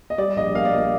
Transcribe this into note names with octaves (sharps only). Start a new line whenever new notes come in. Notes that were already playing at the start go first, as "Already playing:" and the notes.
D#5
G3 D5
A#1 D#5
A#3 F5
D5
A#2 D#5